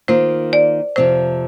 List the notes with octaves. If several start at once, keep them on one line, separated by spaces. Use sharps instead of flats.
D#3 A#3 F4 C5
D5
F2 C3 F3 C5